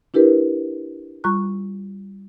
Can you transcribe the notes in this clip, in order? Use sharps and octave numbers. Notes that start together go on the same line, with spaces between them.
D4 E4 G4 A#4 B4
G3 F4 A#5 C#6 F#6